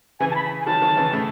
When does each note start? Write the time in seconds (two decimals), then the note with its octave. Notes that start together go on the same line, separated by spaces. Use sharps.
0.20 C#3 E3 G#5
0.31 A5
0.35 B5
0.60 G#5
0.66 D#3 F#3 A5
0.81 D#3 F#3
0.97 C#3 E3
1.13 A2 C#3